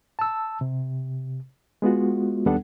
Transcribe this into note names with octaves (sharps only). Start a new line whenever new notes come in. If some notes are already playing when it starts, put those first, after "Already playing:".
A5 E6
C3
G#3 B3 F4 F#4
D#2 G3 B3 D4 A4 F#5